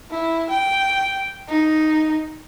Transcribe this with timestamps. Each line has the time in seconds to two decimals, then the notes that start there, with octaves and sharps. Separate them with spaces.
0.11 E4
0.50 G5
1.48 D#4